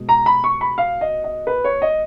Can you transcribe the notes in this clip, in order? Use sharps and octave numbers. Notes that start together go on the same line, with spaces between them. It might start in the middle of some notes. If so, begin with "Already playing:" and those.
Already playing: B2 G#3
A#5
B5
C#6
B5
F5
D#5
D#5
B4
C#5
D#5